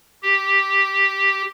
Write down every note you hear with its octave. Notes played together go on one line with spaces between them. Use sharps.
G4